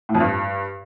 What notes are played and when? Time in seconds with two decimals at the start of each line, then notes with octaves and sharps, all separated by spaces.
0.09 A2
0.15 F2
0.20 G2